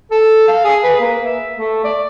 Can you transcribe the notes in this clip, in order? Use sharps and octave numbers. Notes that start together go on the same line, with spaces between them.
A4
F5
G#4
B4
A#3
E5
A3
D5